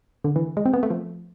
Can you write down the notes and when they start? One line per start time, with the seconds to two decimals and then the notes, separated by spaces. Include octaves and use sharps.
0.24 D3
0.36 E3
0.57 G#3
0.65 C4
0.74 B3
0.83 A3
0.90 F3